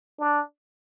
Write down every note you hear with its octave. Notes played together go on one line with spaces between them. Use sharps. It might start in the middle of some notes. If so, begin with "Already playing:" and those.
D4